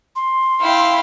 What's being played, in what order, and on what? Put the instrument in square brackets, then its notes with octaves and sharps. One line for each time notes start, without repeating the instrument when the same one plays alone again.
[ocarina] C6
[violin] E4 [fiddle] F5 G5